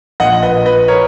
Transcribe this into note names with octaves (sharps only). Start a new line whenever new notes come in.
A#1 A#2 D#5 F#5
B4 D#5
B4 D#5
A#4 C#5